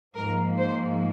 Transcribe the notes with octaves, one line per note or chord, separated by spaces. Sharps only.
G#2 F3 A#3 A#4
C5